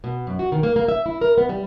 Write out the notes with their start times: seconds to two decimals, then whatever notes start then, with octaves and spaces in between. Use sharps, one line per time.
0.04 B2
0.27 F#2
0.39 F#4
0.52 D#3
0.63 A#3
0.76 A#3
0.88 E5
1.06 E4
1.21 A#4
1.38 B3
1.49 G3